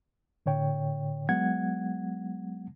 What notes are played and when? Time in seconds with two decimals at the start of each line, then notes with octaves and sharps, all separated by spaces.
0.46 A2 D3 C#5 G5
1.29 F#3 G#3 B3 F#5 G#6